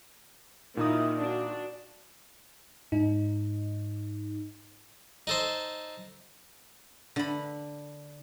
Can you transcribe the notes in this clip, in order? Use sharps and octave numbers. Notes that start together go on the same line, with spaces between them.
A#2 D#3 D#4 E4 D#6
D4 F#4
G#2 D#4
D#4 A4 C5
D3 B5